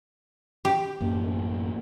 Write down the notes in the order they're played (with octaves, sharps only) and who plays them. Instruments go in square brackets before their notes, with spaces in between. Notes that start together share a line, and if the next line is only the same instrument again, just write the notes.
[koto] G4
[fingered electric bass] A1 F#2 A#3